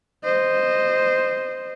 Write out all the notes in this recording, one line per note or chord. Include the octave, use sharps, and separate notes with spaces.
C5 D#5